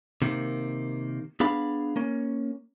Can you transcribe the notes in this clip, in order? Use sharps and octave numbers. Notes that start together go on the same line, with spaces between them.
C3 D#3 A#3
B3 D4 G#4 F5 B5
A#3 C#4